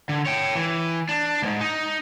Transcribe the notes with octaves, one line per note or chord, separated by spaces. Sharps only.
D3
C#5 G5
E3
D4
D2 G#2
D#4